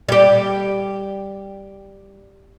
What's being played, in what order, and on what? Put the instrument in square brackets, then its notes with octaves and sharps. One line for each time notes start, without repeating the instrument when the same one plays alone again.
[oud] G3 G4